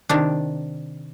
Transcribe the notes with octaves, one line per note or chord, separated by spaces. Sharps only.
C3 D#3 D4